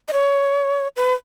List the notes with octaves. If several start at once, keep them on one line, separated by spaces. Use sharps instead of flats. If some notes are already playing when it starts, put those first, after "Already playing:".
D#5
C#5
B4